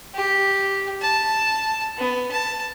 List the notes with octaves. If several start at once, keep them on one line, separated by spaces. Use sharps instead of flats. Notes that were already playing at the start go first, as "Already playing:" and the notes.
G4
A5
B3
A5